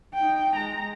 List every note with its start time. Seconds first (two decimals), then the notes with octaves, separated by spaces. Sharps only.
0.14 D#4 G5
0.55 G#3 A#5